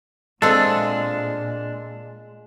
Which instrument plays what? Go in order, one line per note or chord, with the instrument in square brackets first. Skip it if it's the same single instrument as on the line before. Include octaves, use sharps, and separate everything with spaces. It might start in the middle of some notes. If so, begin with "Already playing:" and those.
[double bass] A#2 [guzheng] G#3 F4 [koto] C4 A4 [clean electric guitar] D4